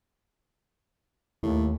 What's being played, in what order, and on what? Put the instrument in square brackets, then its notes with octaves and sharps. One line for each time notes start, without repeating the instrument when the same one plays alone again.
[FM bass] D#2 [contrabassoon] A2